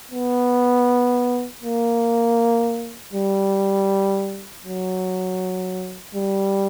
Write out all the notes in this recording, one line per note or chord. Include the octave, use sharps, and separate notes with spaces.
B3
A#3
G3
F#3
G3